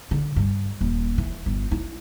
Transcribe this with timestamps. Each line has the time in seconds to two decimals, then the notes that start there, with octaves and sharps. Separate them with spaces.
0.11 D3
0.36 G2
0.81 D#1
1.18 E3
1.46 G1
1.71 E4